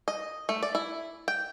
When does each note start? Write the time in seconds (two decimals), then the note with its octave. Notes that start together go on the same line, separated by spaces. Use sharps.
0.08 D#5
0.49 A3
0.63 D5
0.75 E4
1.28 G5